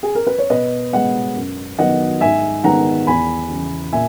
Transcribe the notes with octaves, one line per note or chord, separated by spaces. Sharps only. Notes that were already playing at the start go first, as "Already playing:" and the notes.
G#4
A#4
B4
C#5
B2 B4 D#5
G#3 B3 D#5 F#5
F#2
D#3 F#3 B3 D#5 F#5
G#2 E5 G#5
D#3 G#3 B3 F#5 A#5
E2 G#5 B5
C#3 E3
A#2 E5 G#5